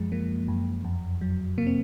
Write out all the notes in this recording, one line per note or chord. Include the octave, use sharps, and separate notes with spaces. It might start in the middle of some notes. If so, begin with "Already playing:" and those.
Already playing: F#2 F3 G#3
F3 A#3
F#2
F2
F#3
C3 A#3
C4